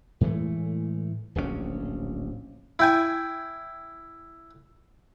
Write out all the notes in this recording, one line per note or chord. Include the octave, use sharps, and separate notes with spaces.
A2 E3 G#3 A3
D1 A#1 A#2 C#4
E4 G5 G#5